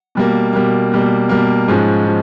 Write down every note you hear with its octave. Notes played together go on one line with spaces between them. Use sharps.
B2 G3 A#3
B2 G3 A#3
B2 G3 A#3
B2 G3 A#3
G#2 F3 G#3 C#4
F3